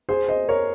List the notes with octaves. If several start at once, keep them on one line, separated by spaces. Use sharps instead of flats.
G#4 C5
C5 D#5
A#4 C#5